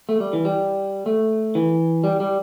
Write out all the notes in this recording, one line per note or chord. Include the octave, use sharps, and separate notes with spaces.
A3
G3
E3
G3
A3
E3
G3
G3